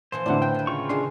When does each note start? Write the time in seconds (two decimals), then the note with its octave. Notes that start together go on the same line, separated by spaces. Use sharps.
0.12 A#2 E3 F3 C5
0.26 A2 D3 C4 F4 D5 F#5
0.42 B4 G5 G6
0.54 D#3 B4
0.67 C#3 F4 C#6
0.89 D#3 G#3 A3 D4 C6